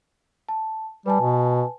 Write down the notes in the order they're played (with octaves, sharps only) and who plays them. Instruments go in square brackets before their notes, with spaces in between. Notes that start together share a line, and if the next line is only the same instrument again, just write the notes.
[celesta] A5
[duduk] G3 [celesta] B4 G#5 A5
[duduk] B2